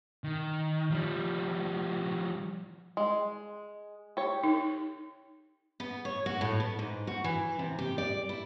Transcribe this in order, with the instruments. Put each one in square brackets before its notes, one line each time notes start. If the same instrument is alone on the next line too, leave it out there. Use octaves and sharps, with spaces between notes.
[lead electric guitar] D#3
F3 G3
[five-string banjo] G#3
G4 C#5
[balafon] D#4
[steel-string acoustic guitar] B3
C#5
F#4
A2
B3
G#2
F#4
E3
C3
G4
D5
E4